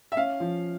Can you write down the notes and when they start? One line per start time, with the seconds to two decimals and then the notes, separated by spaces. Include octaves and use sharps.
0.12 E5
0.17 C#4 F5
0.40 F3